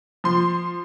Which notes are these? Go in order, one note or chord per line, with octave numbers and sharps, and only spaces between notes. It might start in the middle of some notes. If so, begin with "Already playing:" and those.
F3 C6